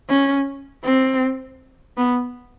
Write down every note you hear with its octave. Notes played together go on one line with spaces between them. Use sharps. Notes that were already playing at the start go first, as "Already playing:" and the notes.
C#4
C4
B3